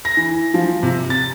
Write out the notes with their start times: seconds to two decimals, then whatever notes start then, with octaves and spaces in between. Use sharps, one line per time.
0.05 A#6
0.17 E3
0.54 F3
0.83 C3
1.10 A6